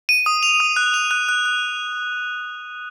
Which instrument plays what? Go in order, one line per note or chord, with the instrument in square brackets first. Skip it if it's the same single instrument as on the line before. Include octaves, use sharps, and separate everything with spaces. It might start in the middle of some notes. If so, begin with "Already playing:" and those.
[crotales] D#7
D#6
F7
D#6
F#6
F7
F#6
F#6
F#6